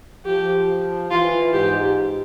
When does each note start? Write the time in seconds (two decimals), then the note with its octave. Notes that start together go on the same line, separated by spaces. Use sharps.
0.25 F3 G4
1.10 E3 F4
1.53 G#2 G4